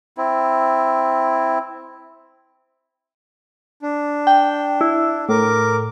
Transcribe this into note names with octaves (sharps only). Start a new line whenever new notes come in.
C4 E4
D4
G5
E4
A2 A#4 D6